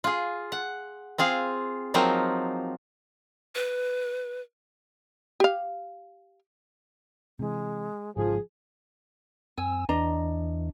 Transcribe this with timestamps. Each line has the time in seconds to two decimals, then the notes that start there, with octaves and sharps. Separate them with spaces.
0.04 F4 G#4
0.52 F#5
1.18 C4 F4 G#4 F5
1.94 F3 F#3 A#3 C4 D#4 F4
3.55 B4
5.40 G4 F5
7.39 C3 E3 G#3
8.17 G#1 G#2 C#3 F3 G#4
9.58 F#2 C4 G#5 E6
9.89 E2 E3 D4 D#5 A#5